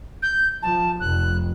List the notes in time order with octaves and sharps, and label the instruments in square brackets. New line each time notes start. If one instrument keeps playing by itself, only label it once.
[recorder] G6
[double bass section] F3 [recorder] A5
[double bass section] F1 [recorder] F#6